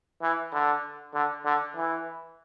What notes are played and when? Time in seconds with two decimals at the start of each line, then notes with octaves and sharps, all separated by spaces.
0.22 E3
0.53 D3
1.14 D3
1.45 D3
1.76 E3